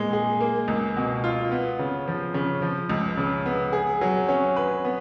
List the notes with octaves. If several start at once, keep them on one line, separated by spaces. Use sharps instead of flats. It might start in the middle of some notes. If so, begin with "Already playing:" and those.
Already playing: A#2 G#3
G#4
A#3
C#2
B2
F4
B3
C#3
F3
C#3
F3
C#2
C#3
B3
G#4
F#3
C#4
B4
B3